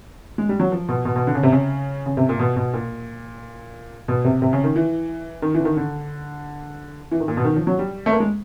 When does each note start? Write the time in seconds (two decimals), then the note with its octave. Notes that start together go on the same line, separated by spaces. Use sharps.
0.38 G#3
0.49 G3
0.60 F#3
0.72 F3
0.89 B2
1.05 B2
1.16 B2
1.27 D3
1.35 C#3
1.43 C3
1.52 C#3
2.06 C#3
2.17 C3
2.29 A#2
2.39 B2
2.56 B2
2.73 A#2
4.08 B2
4.25 C3
4.42 C3
4.53 C#3
4.64 D#3
4.76 E3
5.42 D#3
5.55 E3
5.60 D3
5.65 D#3
5.77 D3
7.12 E3
7.20 D#3
7.28 A#2
7.37 B2
7.45 D#3
7.56 F3
7.67 F#3
7.79 G3
8.06 A3
8.12 A#3
8.20 G#3